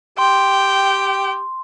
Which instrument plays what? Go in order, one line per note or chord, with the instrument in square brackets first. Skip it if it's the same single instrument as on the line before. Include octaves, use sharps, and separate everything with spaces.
[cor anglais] G4 [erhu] G5 [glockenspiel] C6